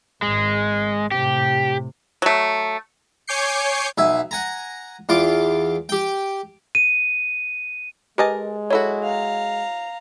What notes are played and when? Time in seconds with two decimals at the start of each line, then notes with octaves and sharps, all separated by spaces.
0.22 G#1 G#3
1.11 A2 C3 G4
2.22 F#3 A3
3.27 C#5 G#5 D6 G6 C7 C#7
3.98 B1 E5 G#5
4.31 F#5 G#5 A#5
5.09 E2 F4 D6
5.89 G4 G5
6.75 D#7
8.18 G#3 G4 A#4 B4 D#5 G#5 A5
8.70 F#3 E4 F#4 A4 C#5
9.04 F5 A#5